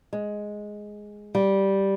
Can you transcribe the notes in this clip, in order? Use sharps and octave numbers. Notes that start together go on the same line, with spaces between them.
G#3
G3